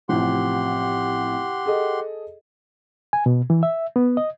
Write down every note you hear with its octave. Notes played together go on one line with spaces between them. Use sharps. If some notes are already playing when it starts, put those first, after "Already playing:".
A1 C3 F3 G4 F#5 C6
G#4 A4 D#5
G#5
B2
E3
E5
B3
D#5